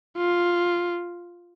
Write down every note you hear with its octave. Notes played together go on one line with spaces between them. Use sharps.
F4